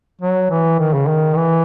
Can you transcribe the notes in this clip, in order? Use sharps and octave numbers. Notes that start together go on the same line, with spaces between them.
F#3
E3
D#3
C#3
D#3
E3